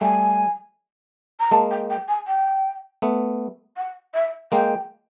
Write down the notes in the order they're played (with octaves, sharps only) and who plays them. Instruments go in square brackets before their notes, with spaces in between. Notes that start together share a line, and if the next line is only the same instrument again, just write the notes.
[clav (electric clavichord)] G3 A3 [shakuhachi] G#5
[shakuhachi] A#5
[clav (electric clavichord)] G#3 A#3 [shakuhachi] A5
[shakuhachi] G5
G5
G#5
G5
[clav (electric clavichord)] A3 B3
[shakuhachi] F#5
E5
[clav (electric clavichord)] G#3 A#3 [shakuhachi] G5